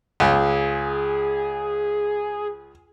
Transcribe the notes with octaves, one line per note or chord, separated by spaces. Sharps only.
C#2 G#4